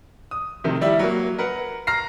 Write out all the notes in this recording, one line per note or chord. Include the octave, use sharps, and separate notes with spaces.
D#6
C3 D#3 A3
G3 E4 G4
F#3 A#3
A#4 B4 F#5
A#5 F6 A#6 C7